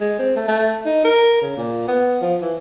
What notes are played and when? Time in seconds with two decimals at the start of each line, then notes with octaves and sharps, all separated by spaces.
0.01 G#3
0.19 C4
0.36 A3
0.48 A3
0.86 D#4
1.04 A#4
1.42 C#3
1.57 A#2
1.88 B3
2.22 F3
2.42 E3